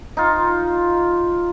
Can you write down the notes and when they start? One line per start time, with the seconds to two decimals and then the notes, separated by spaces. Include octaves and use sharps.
0.17 D#4 F4